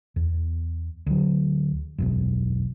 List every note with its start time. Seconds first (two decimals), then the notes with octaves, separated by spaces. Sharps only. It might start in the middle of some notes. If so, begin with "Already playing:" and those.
0.16 E2
1.06 D2 F#3
1.98 E1 B1 F#2